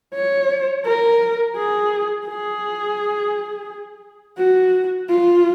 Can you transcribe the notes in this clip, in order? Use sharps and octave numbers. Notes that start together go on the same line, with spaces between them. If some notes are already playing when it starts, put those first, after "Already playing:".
C#5
A#4
G#4
G#4
F#4
F4